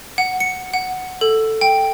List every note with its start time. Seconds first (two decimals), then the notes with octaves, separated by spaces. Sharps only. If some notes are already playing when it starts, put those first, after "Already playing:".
0.18 F#5
0.40 C#7
0.74 F#5
1.21 A4
1.61 G5